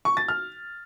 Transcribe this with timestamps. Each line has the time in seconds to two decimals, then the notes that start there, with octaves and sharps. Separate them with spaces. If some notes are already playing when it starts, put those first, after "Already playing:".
0.05 C#6
0.17 A6
0.28 F6